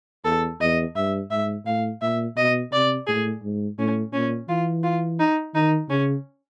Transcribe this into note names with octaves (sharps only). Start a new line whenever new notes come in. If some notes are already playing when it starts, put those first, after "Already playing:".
E2 A4
E2 D#5
G2 E5
G#2 E5
A2 F5
A#2 E5
B2 D#5
C3 D5
A2 G#4
G#2
A2 C#4
A#2 C#4
E3 F4
F4
D#4
D#3 D#4
C#3 C#4